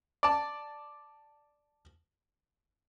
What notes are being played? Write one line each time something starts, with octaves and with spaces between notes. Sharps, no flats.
D5 A5